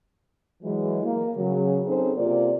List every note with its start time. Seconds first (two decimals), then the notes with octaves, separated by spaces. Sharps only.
0.62 E3 F#3 G#3
1.04 A#3
1.37 C#3 F#3
1.84 C4 C#4 D#4 G#4 A4 C5
2.17 C3 A#3 F4 D5